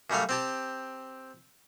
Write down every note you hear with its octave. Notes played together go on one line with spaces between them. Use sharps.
F#2 G3 A3 F5
C4 G4 A5